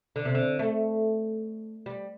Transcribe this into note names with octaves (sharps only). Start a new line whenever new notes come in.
D3
C3
D3
A3
G3